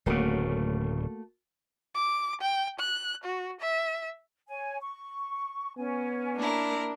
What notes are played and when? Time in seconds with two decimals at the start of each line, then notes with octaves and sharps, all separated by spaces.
0.06 D1 C#3 A3 A#3 F#4
1.95 D6
2.41 G5
2.79 F#6
3.24 F#4
3.61 E5
4.48 C#5 G#5
4.81 C#6
5.78 B3 C#4 G#5
6.36 A#3 D4 E4 A#4